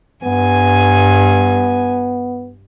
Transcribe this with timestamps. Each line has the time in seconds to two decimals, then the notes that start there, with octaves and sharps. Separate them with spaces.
0.25 G2 B3 G#5